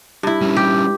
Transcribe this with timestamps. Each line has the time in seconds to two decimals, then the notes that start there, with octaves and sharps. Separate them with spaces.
0.23 G2 E4
0.42 G3 C#4
0.56 G4